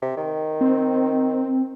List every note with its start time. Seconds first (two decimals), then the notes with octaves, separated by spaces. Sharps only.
0.02 C3
0.17 D#3
0.61 C4